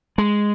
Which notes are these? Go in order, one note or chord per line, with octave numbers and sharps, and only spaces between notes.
G#3